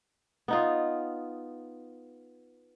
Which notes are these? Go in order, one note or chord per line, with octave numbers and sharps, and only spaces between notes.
B3 D#4 F4